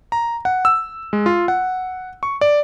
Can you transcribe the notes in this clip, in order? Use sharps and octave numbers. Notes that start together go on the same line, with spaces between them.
A#5
F#5
E6
G#3
F4
F#5
C#6
D5